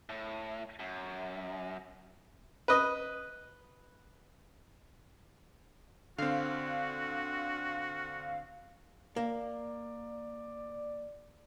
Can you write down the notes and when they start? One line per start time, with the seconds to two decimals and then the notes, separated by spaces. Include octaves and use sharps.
0.09 A2
0.79 F#2
2.68 B4 D#5
6.18 D3 C4 F#4 F5
9.16 A#3 D5